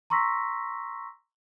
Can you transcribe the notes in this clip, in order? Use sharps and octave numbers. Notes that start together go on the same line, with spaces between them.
A#5 C6 C#6 E6 A#6 B6